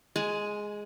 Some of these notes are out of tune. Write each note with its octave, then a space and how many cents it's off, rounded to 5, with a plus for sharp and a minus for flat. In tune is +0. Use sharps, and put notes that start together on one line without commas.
G#3 +0 G#5 +30